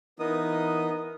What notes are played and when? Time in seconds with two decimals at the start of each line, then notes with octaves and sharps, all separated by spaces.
0.19 E3 B3 D#4 A#4 D#6